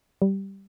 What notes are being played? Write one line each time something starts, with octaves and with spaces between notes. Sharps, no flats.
G3